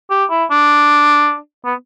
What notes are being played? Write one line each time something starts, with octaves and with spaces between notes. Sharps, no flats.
G4
E4
D4
B3